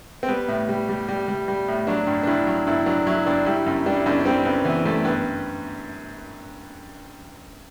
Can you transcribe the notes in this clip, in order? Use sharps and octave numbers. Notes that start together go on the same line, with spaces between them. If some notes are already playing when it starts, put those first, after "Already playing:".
C4
G3 B3
A2
G3
G3
G3
G3
G3
A2
F#3 D4
G2
D4
G2 E4
F#3
G2 E4
F#3 D4
F#3 E4
G2 D4
G3 E4
F#2
G3 D4
E4
F#2 D4
D4
G3 C4
F#2 B3
E3 B3
F#2 A3
G2 B3